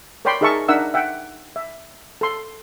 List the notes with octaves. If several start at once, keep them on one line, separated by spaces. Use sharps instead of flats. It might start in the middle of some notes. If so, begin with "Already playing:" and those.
A#4 C#5 D5 G5 B5 C6
D#4 G#4 A#4 E5 A5 C#6
D4 D#4 A#4 E5 F#5 E6
E5 F#5 G5
E5
A4 C6